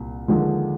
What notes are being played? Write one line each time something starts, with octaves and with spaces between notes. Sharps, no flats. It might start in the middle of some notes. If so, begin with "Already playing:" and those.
Already playing: C2 A#2
D#2 D3 F3 G#3